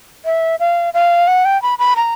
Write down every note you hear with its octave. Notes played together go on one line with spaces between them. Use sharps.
E5
F5
F5
F#5
G5
B5
B5
A#5